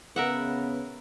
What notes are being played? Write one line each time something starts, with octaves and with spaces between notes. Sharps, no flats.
C#3 B3 A#4 E5 F#5